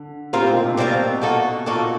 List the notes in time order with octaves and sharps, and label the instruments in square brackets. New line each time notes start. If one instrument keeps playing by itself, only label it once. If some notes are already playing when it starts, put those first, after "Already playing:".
Already playing: [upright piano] D3
[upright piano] A2 [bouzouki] G3 C4 F4 A#4
[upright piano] A#2
B2
C3
[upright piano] B2 [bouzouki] G3 C4 F4 A#4
[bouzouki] A#3 D#4 F#4 A4
[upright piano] A#2 [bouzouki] A#3 D#4 F#4 A4